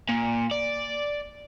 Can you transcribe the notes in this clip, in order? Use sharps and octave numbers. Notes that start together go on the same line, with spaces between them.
A#2
D5